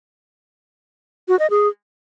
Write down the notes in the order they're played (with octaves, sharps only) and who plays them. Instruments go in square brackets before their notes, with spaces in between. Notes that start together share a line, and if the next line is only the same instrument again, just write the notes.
[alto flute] F#4
D#5
G#4